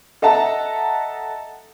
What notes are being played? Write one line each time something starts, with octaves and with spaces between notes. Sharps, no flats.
A4 D#5 E5 F#5 A5 A#5